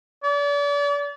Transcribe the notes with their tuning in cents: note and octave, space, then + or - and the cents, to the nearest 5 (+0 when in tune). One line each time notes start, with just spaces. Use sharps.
D5 -40